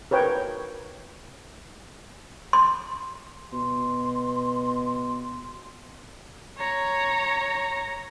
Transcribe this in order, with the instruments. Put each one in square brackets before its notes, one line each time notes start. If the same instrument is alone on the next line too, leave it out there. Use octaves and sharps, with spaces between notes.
[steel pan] A#4 B4 C#5 G5
[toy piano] C6
[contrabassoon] B2 [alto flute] C6
[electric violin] C#5 A#5